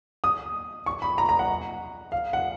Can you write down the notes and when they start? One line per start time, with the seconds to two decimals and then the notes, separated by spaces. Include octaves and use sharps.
0.24 D#6
0.86 C#6
1.02 B5
1.18 A#5
1.29 A#5
1.39 F#5
2.12 F5
2.33 F#5